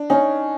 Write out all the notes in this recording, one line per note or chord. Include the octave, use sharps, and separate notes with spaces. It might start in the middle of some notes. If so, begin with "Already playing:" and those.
Already playing: D4
C#4 D#4